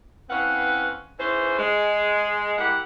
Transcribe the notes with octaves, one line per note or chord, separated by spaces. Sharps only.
E3 C4 C#4 B4 F5 F#5
G#2 E3 C#4 B4 C5
G#3
A#3 E4 G4 F#5